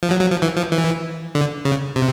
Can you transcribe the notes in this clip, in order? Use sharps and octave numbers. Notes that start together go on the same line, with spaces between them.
F3
F#3
F#3
F3
E3
F3
E3
D3
C#3
C3